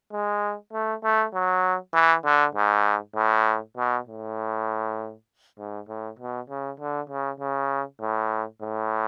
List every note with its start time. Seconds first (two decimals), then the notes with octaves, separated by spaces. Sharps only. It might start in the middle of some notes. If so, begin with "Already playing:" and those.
0.12 G#3
0.73 A3
1.03 A3
1.34 F#3
1.94 E3
2.25 D3
2.55 G#2
3.16 A2
3.77 B2
4.07 A2
5.58 G#2
5.88 A2
6.19 B2
6.50 C#3
6.80 D3
7.09 C#3
7.40 C#3
8.01 A2
8.62 A2